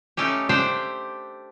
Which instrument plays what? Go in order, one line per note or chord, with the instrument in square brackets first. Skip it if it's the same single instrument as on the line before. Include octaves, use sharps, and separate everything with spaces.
[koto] A3 C#4 D#4 G4
A3 D4 G4 C5 G5